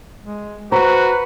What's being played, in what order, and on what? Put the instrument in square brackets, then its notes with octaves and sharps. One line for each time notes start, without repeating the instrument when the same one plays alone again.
[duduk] G#3
[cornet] F#4 [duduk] B4 [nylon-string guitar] C5 [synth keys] A#5